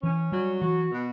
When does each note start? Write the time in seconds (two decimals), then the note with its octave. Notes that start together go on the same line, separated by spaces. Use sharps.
0.03 E3 C#4
0.32 F#3 G3
0.62 E3 F#4
0.92 B2